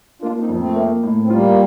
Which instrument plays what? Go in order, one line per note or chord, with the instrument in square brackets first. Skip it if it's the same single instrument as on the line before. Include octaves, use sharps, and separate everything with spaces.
[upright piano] A#3 [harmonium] D4 F4
[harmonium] C4 D#4
[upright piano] F2
[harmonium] A3 C4
[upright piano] A#3
A2
[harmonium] C4
[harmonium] G3 A#3 [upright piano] F4